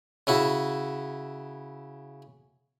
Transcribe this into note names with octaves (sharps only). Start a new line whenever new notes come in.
C#3 E4 F#4